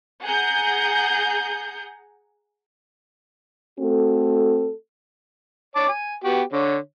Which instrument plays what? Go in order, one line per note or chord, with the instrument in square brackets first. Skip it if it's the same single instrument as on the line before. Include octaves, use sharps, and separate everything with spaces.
[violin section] G#4 F#5 A#5 G6
[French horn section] A3 C4 F#4 A4
[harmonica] C#5 A5 D6
G#5
B3 F#4 G4
D3 C#5